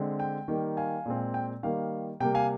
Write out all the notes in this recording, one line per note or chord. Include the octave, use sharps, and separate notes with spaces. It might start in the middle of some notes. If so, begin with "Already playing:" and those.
Already playing: D3 G#3 C4
G5
D#3 G3 A#3
F5 G#5
A#2 G#3 C4
G5
D#3 G3 A#3 F5
C3 G3 A#3 G5
F5 G#5